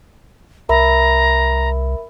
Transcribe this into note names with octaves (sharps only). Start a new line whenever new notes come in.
C2 A#4 E5 A#5 B5